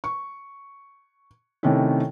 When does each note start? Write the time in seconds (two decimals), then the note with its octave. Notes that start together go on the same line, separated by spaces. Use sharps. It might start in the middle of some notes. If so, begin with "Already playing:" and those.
0.04 C#6
1.63 C3 D#3 A3 C#4 E4